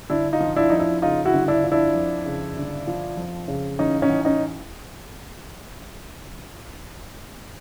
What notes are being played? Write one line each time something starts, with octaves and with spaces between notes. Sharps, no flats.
G1 D4 E4
D#4 F4
F3
D4 E4
F2 D#4
D4 E4
C#3 D#4 F4
E4 F#4
G1
D4 E4
F3
D4 E4
F2
C#3
G1
F3
F2
C#3
A1 C#4 D#4
C#4 D#4
A1
C#4 D#4